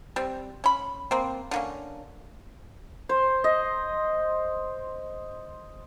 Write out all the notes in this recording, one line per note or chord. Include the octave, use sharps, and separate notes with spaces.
G3 C4
C#4 B5
A#3 C4
D3 A#3 C#4
C5
D#5